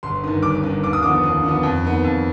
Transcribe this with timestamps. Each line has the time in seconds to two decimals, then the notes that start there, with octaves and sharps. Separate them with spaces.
0.03 G1 C6
0.24 G2 D#3
0.42 G1 D6
0.63 G2 D#3
0.83 D#2 D6
0.93 D#6
1.02 D3 F3 B3 D6
1.23 D#2
1.43 D3 F3 B3
1.63 F2
1.84 D#3 B3
2.04 F2